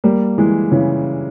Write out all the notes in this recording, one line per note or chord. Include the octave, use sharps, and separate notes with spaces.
G3 A#3
E3 G#3
C#3 E3